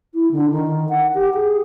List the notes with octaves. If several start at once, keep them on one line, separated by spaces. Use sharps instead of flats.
E4
D3
D#3
F#5
G4
G#4